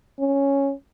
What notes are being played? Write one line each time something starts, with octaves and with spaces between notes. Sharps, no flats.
C#4